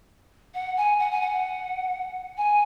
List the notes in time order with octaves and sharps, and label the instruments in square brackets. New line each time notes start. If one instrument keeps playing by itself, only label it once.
[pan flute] F#5
G#5
F#5
G#5
F#5
G#5